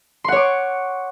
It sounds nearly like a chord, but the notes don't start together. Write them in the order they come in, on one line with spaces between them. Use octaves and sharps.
C6 F#5 C#5 D6